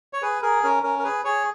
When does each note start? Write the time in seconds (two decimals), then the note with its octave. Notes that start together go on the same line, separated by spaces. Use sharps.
0.13 C#5
0.22 G#4 B4
0.42 G#4 A#4
0.63 C#4 A#4
0.83 C#4 A#4
0.99 A#4
1.04 G#4 B4
1.25 G#4 C#5